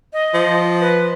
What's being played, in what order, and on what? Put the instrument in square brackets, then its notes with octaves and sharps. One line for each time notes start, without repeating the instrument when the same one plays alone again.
[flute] D#5
[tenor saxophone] F3
[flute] B4